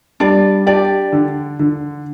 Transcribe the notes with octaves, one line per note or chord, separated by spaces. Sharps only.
G3 D4 D5
D4 G4 D5
D3
D3